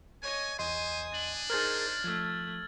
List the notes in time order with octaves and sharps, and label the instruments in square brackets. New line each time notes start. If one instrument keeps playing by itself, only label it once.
[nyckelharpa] C#5 D#5 [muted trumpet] G#5
[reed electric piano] E2 D#5 C6 [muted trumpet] C5 [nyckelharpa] G#5 D#6
[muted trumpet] D4 [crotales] F#7
[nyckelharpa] D#4 C5 [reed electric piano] G#4 A#4 [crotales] F6 G#6 A6
[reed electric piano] F3 [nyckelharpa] A3 [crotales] E6 G#6